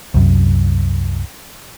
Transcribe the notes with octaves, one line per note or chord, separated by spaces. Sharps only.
C2 F#2